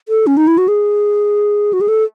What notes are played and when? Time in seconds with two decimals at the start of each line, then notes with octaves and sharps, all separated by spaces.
0.09 A4
0.27 C#4
0.37 D#4
0.47 E4
0.58 F#4
0.68 G#4
1.73 F#4
1.81 G#4
1.88 A4